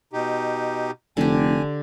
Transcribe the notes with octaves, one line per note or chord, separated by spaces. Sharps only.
B2 D#4 G4
F1 D3 G4 G#5